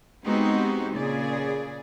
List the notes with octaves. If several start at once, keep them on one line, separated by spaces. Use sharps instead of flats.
G#3 B3 C4 D#4 F#4 G4
A#2 C#3 G#4 D5